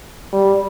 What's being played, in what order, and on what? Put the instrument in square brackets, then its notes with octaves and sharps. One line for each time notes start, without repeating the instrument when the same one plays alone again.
[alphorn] G3